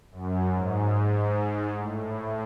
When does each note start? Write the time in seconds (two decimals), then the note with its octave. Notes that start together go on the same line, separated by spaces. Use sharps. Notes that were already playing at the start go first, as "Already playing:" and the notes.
0.12 F#2
0.53 G#2
1.78 A2